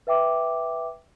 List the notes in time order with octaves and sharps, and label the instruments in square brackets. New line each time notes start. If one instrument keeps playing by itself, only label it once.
[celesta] B4 E5 G5 D6